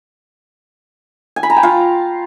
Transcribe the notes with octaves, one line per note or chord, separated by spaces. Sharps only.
G#5
B5
A#5
G5
F4